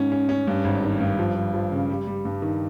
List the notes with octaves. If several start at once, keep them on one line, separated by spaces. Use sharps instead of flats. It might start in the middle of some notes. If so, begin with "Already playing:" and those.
Already playing: G#2 C#4
C#4
C#4
G2
G#1
D#3
G2
F3
F3
F3
C#3
G3
G3
G2
D#3